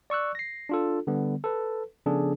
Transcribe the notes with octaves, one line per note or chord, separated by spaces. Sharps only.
D5 C#6 E6 F#6
A#6 C7
D4 F4 A4
D3 G3 B3
A4 B4
C#3 F3 B3 D4 G#4 A4